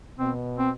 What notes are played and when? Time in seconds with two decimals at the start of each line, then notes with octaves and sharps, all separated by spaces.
0.19 B2 C4
0.58 C4